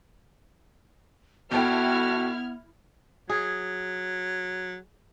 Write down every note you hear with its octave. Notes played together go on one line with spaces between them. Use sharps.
G1 B3 E4 F#4 A4 G5 F6 G#6
F#3 G#4